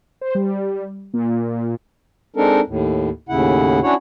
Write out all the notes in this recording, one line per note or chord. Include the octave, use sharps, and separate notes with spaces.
C5
G3
A#2
G#3 C4 D4 D#4 A4 A#4
D#2 A2
D#2 A2 C#3 E4 F#5
C#4 D4 E4 F#4 C#5 F#5